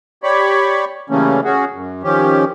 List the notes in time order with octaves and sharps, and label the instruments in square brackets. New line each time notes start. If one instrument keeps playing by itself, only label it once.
[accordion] G4 C#5 D5 B5 C#6
C#3 E3 G3 A3 A#3 C#4
C#4 F#4 G#4
F#2
D#3 F3 C#4 G4